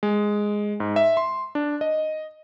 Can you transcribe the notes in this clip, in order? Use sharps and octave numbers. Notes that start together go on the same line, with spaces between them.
G#3
G#2
E5
C6
D4
D#5